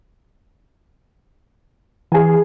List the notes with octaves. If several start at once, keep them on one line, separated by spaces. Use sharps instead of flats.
E3 G#4 G#5